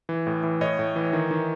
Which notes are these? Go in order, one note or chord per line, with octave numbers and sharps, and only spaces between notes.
E3
A2
E3
A2 C#5 D#5
A2
E3
D#3
D#3